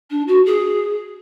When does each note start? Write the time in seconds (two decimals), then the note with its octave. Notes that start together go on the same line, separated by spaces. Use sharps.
0.10 D4
0.27 F#4
0.46 G#4